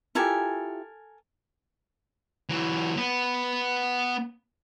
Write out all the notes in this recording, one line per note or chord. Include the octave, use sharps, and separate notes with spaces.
E4 F4 G4 A4 A#4 G#5
E3 F#3
B3